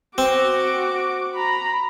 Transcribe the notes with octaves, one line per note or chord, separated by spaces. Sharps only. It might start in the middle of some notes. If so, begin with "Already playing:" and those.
C4 F#4 D6
A#5 B5